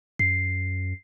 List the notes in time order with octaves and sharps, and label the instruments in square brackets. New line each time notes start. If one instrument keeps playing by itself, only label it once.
[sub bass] F#2 [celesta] C7